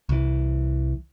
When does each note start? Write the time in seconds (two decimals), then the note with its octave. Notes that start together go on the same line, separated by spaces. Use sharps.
0.09 C2 E3